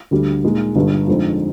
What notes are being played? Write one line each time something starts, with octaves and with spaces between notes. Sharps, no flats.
D2 D3 G3
A#2 G#3 D#4 G#4
G1 G2 D3 G3
F2 D3 G#3 C4 D#4